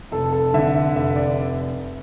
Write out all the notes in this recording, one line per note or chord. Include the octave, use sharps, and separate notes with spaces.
F1 A4
A4
D3 E5
E5
F1 E5
D5